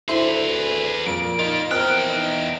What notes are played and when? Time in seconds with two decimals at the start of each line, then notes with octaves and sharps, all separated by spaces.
0.08 D2 E4 G#4 B4 C5
1.06 F2 A#2 D7
1.39 A#3 D#4 F4
1.71 E2 C4 A#4 G5 F6 F#6
2.09 D#4